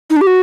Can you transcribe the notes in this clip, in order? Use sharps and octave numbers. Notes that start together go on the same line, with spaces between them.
D#4
D4
G4
F#4